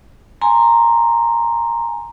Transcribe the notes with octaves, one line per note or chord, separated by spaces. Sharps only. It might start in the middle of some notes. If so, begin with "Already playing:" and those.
G#5 A#5 C6